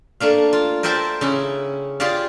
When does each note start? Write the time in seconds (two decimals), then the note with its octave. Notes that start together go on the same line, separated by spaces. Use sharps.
0.20 A3 A#3 D4 F5
0.53 F4
0.83 A#4 C5 D5 E5 G5 A5
1.21 C#3 C#4 E4
2.00 F4 G4 G#4 D5 F5